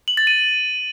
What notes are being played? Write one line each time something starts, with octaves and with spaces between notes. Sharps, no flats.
F#7
A6
D#7